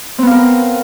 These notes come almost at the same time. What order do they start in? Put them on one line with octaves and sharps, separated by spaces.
C4 B3 F5 A#4